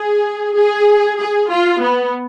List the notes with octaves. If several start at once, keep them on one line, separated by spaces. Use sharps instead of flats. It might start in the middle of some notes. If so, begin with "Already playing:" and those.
Already playing: G#4
G#4
G#4
F4
B3